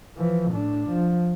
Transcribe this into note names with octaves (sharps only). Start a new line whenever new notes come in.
E3 F3
A2 D4
F3